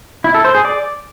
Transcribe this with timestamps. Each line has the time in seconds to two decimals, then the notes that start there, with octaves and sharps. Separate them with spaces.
0.24 E4
0.34 A4
0.45 C5
0.55 G#4
0.65 D5